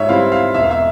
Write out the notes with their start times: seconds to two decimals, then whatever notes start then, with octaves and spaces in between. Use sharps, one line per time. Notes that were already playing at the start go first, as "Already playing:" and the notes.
Already playing: G#2 C#5 E5
0.09 G3 C4 E4 F5
0.32 F5
0.54 E1 E5
0.63 F5
0.71 E5